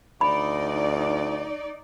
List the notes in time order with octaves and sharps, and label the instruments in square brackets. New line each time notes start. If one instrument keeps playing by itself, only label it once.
[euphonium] D2 [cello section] D#4 D5 [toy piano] B5